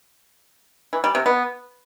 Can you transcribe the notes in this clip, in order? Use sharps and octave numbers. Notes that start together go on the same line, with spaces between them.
E3
G3
C3
B3